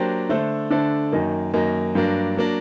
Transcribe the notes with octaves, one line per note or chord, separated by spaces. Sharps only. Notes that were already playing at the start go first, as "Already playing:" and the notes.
Already playing: F#3 A#3 D4 G4 C5
D3 A3 D4 A4 C5
D3 A3 D4 A4 C5
F#2 D#3 F#3 A#3 D#4
F#2 D#3 F#3 A#3 D#4
G2 F#3 A#3 D4
F#3 A#3 D4